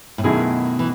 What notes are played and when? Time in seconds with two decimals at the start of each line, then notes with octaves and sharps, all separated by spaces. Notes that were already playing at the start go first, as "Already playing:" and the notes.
0.18 A2
0.23 F#2 B2 D#3 A3 E4 G#4
0.79 E3